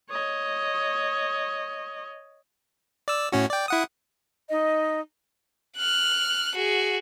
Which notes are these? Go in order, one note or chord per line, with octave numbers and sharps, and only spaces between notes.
C#5 D#5
D5 E6
A2 C#4 F#4
D5 G5
E4 F#5 D#6
D#4 D#5
F6 F#6
F#4 G#4